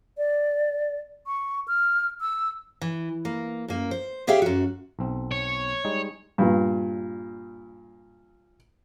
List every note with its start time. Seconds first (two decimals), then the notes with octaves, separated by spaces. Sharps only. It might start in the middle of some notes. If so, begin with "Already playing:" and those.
0.18 D5
1.27 C#6
1.68 F6
2.21 E6
2.81 E3
3.25 A#3
3.68 F#2 A#3
3.91 C5
4.27 G4 G#4 C#5 E5 F5 G5
4.42 F#2 F#4
4.99 B1 C4
5.31 C#5
5.84 G3 G#3 D#4
6.38 G2 A#2